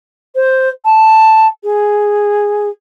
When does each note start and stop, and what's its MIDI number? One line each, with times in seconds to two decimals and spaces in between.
0.35 0.69 72
0.85 1.47 81
1.64 2.68 68